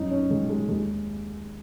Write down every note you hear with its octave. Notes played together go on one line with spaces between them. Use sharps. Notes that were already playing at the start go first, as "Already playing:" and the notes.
Already playing: F#2 D#4
C#4
D#3 G#3
G#3
D#2 G#3